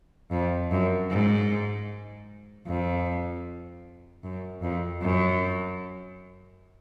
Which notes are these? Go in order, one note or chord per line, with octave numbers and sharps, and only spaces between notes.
F2
F#2
G#2
F2
F#2
F2
F#2